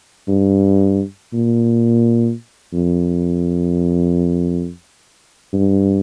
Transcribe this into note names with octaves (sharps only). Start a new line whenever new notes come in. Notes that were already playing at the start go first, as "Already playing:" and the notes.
G2
A#2
F2
G2